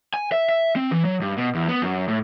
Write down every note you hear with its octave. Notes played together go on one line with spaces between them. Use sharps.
G#5
E5
E5
C4
E3
F#3
G2
B2
E2
B3
F#2
A2